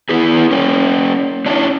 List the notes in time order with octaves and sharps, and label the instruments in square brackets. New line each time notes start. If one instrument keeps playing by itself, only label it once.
[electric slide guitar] B3 E4 G#4
A#3 C#4
C#4 D4 E4